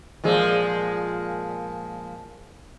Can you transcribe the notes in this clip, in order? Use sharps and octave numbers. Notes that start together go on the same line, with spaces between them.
A#2 F3 G#3